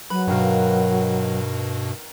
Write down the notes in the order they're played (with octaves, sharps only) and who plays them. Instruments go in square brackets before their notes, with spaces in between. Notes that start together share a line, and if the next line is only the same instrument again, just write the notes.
[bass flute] F#3 [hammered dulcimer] B4 [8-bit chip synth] B5
[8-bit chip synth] G2 B2 [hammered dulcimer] D#3 F5